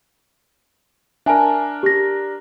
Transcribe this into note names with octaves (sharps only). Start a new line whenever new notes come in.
D4 A#4 E5 G#5 A5
G4 A#6